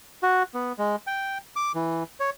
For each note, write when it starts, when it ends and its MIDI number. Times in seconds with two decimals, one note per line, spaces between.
0.23 0.43 66
0.54 0.72 59
0.78 0.96 56
1.07 1.38 79
1.56 1.72 86
1.75 2.03 52
2.20 2.30 73